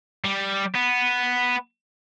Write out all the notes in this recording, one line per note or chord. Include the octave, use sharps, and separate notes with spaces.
G3
B3